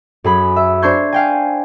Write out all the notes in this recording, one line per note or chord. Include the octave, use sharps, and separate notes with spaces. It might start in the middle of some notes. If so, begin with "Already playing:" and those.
F#2 G#4 B5
E5
D4 C5 C6 C#6 G6 G#6
F5 G5 G#5